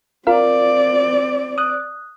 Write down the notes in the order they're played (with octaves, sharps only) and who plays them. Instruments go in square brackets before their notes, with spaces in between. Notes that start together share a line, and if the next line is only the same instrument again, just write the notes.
[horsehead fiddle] C4 D5 [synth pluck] F4 A#4 F5
[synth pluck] D#6 F#6